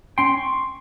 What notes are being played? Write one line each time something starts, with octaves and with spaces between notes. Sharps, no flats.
C#4 G5 C6
C#6